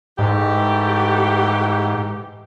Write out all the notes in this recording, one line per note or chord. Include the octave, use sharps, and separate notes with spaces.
G#2 E3 A3 G4